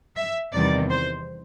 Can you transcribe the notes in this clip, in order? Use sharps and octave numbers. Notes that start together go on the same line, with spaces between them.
E5
E2 C3 D#3 G3 D5
C5